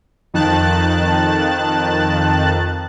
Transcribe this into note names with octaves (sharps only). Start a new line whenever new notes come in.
F2 D#3 A5 F#6 A6